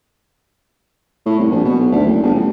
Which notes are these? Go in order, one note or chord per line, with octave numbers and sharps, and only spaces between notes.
A2
C2
A#1
B2
B1
D2
F#1
G1
A1